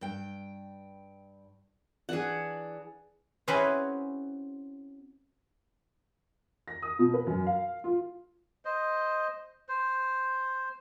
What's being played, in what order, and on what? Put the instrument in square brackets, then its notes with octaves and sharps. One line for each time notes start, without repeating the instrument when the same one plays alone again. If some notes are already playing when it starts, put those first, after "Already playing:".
[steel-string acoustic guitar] G2 G5
[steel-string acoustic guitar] E3 D4 [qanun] G#4 F#5
[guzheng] C4 C#4 E4 F#4 G#4 B4
[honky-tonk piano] A#6
D#6
B2
B4
F#2
F5
F4
[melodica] C5 D#5
C5